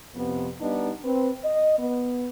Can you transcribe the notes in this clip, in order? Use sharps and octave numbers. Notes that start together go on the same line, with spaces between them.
F2 C3 B3
G3 B3 D4 D#4
C4 B4
D#5
B3